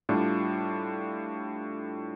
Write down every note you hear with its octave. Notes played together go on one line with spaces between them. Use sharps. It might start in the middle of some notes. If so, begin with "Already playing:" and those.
A2 G3 D4 F4